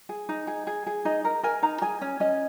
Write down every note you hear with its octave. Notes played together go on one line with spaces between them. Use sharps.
G#4
D#4
G#4
G#4
G#4
D#4 D#5
A#4
A#4 G#5
D#4 A#5
G#4 G#5
C#4
C#4 D#5